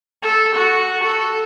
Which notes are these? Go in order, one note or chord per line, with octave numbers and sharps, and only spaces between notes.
A4
F#4
A4